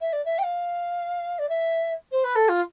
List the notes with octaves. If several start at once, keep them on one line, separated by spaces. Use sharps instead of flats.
E5
D5
E5
G5
F5
D5
E5
C5
B4
A4
F4